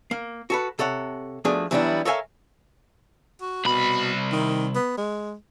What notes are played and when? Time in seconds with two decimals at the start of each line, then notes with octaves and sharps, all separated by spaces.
0.11 A#3
0.50 F#4 A4 B4
0.79 C3 A4 C#5 F#5
1.45 F3 A3 B3 D4 F#4 G#4
1.71 E3 F#3 G3 B3 D4 E4
2.05 A4 A#4 C#5 E5 F5 G#5
3.41 F#4
3.65 C2 B2 B5
4.32 D#3
4.75 B3
4.97 G#3